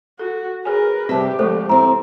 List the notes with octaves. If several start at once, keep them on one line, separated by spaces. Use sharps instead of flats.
F#4 A4
G#4 A#4 B4 C#5 G#5
C3 G3 C4 G4 E5 A5
D2 F3 G#3 A3 A4 C5
C4 E4 A#5